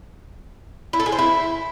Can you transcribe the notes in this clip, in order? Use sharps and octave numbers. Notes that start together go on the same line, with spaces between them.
E4
A4
G#4
C5
E4